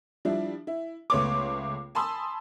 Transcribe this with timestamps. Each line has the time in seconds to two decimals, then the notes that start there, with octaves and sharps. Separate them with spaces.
0.25 F3 G3 D4 E4
0.67 E4
1.10 C#2 A3 B3 C#5 C6 D6
1.95 G#5 A5 B5 C6 D#6 E6